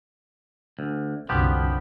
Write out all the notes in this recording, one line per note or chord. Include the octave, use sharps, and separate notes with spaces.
D2
C2 F#2 D3 F3 B3 G4